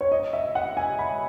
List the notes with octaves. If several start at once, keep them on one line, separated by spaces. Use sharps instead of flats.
C#5
D#5
E5
F#5
G#5
B5